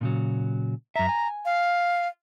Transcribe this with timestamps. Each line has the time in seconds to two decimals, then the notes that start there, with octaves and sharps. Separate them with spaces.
0.01 A#2 C#3 F#3
0.96 F#2 E5 A#5
1.09 G#5
1.45 F5